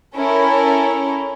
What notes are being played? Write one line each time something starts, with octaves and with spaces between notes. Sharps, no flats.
C#4 E4 A4 A#4